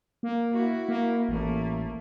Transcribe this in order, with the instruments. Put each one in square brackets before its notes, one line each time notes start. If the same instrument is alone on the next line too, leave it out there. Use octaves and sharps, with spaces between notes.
[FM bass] A#3
[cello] E4 F#4
[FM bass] A#3
[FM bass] A1 [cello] A3 A#3